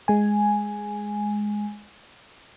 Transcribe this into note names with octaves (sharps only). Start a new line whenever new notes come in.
G#3 G#5